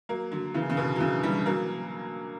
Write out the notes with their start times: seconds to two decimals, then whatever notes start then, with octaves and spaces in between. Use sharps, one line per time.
0.09 F#3 A#3
0.32 D3 F#3
0.54 C#3 E3
0.70 C#3
0.77 B2 D3
0.96 F#3
1.00 C#3 E3
1.23 E3 G3
1.46 F#3 A#3